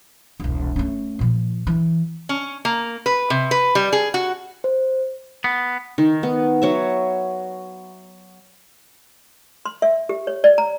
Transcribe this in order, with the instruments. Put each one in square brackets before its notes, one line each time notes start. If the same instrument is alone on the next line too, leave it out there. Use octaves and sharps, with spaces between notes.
[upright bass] E1 C2
A3 C#4
A#2 F3
E3
[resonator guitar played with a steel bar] C#4
A#3
B4
C3
B4
G3
G#4
F#4
[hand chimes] C5
[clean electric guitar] B3
[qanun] D#3
B3
F#3 C#5 E5
[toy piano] C6
E5
G4
C#5
D5
A#5